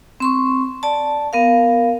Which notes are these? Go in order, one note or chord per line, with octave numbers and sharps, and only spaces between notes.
C4 C6 C#6
D5 A5
B3 A#4 F5